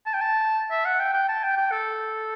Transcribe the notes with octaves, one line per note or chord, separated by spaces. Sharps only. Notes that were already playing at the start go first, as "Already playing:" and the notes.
A5
G5
A5
E5
F#5
G5
G5
A5
G5
G5
A4